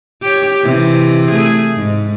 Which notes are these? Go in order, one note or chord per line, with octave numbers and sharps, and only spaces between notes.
G4 C#5
C3 E3
A3 G#4
G#2